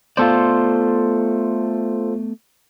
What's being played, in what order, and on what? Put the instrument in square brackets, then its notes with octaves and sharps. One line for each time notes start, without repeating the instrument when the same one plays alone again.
[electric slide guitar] A3 B3 D5 [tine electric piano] F4 A4 C5